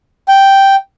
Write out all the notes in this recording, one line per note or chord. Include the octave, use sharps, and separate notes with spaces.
G5